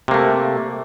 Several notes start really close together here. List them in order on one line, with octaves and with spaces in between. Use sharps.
C3 A#3 A3